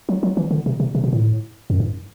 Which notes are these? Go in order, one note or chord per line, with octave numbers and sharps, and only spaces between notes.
F#3
F#3
E3
D3
C3
C3
C3
B2
A2
F#2
G2